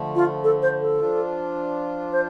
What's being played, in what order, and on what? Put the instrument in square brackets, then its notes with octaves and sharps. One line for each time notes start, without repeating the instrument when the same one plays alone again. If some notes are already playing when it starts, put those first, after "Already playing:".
Already playing: [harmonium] D3 F3 A3
[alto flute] F4
A4
C5
A4
[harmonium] F3 D4 F4
[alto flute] C5